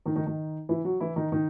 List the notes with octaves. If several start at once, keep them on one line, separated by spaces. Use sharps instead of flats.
D#3 D#4
D#3 D#4
D#3 D#4
E3 E4
F#3 F#4
E3 E4
D#3 D#4
D#3 D#4